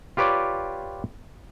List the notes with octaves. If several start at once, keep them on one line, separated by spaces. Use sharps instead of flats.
F4 G4 B4 C#5 D5